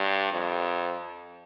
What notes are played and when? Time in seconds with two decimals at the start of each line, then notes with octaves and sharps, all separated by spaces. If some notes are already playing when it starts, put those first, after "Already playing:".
Already playing: G2
0.32 F2